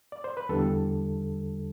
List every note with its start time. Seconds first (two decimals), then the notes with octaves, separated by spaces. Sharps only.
0.12 D5
0.24 C5
0.37 B4
0.49 E2 D3 G3 A4